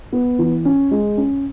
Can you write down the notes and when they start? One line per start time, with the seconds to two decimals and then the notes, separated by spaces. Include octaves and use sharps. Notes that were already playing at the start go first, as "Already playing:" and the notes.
0.13 B3
0.39 E3
0.65 C#4
0.91 G#3
1.17 C#4